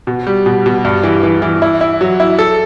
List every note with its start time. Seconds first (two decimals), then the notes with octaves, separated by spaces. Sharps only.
0.07 B2
0.27 G3
0.46 B2
0.66 B2
0.85 G2
1.03 E3
1.23 E3
1.42 E3
1.62 E4
1.81 E4
2.01 F#3
2.20 E4
2.39 A4